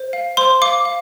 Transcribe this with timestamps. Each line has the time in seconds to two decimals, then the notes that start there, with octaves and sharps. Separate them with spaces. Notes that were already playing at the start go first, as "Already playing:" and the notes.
Already playing: C5
0.13 F5
0.37 C5 C6
0.62 F5 D6
0.85 F5